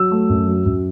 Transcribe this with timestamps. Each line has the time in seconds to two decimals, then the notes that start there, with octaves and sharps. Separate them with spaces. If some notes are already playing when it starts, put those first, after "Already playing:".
Already playing: F#3 E6
0.11 A3
0.29 F#2
0.47 F#3
0.66 F#2